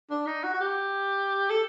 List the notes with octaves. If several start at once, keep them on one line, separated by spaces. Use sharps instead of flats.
D4
D#4
F#4
F#4
G4
A4